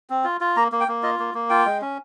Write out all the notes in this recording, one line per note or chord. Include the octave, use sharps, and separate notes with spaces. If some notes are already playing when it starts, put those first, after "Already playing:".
C4
F4
F4
A#3 A#5
A#3
G5
A#3
F4 D#5
A#3
A#3
F4 G5
G#3
C#4